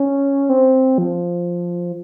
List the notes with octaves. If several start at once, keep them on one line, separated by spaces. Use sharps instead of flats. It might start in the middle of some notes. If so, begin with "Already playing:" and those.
Already playing: C#4
C4
F3